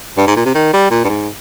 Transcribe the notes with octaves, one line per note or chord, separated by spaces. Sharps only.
G2
G#2
A#2
C3
D#3
G3
A#2
G2
G#2